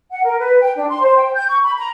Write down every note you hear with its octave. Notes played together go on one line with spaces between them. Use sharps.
F#5
A#4
B4
G5
D4
C6
C5
G5
G6
C#6
B5
A#5